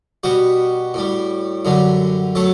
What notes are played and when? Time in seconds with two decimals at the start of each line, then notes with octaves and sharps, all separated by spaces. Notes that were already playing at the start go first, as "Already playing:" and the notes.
0.23 B2 G3 F#4
0.94 A2 G3
1.65 F#2 D3 G3
2.35 F#3 A3 A4